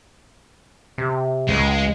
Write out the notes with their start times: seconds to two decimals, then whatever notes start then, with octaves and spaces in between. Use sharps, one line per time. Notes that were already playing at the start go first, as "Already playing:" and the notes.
0.98 C3
1.49 C#2 G#3